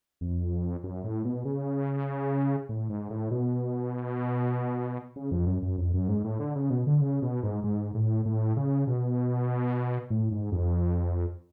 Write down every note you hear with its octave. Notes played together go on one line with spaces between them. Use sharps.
F2
F#2
A2
B2
C#3
A2
G#2
A2
B2
C#3
F2
F#2
F#2
F2
F#2
G#2
A2
D3
C#3
B2
D3
C#3
B2
G#2
G#2
A2
A2
C#3
B2
A2
G#2
F2